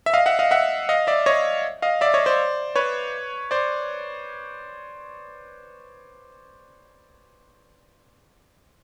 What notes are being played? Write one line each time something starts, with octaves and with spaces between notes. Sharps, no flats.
E5
D#5 F5
E5 F#5
D#5 F5
E5 F#5
D#5 F5
D5 E5
C#5 D#5
D#5 F5
D5 E5
C#5 D#5
C5 D5
B4 C#5
C5 D5